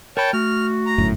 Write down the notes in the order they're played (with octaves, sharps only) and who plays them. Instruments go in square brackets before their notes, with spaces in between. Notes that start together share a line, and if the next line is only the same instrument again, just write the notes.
[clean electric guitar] A#4 B5 [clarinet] C#5 [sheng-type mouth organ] G5 A5
[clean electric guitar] A3 [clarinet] F#4 [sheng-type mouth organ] F6
[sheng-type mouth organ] A#5
[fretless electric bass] G1 F#2 A2